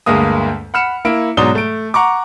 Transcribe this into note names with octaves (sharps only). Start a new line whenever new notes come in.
D2 G2 G#3 A#3 D#6
F#5 B5 F6 C#7 E7
A#3 E4 D7
G#2 B2 F#3 D5 D#6 G7
A3 D7
F#5 A#5 C#6 D6